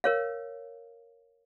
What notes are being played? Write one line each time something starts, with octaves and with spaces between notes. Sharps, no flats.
A#4 C#5 F5